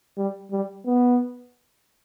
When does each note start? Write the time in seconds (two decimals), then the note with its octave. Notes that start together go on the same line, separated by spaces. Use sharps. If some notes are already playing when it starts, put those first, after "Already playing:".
0.17 G3
0.52 G3
0.86 B3